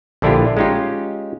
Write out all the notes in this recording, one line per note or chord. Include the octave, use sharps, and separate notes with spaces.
A#1 D3 D4 E4 F4 G4
G#3 C#4 D#4 F4 G4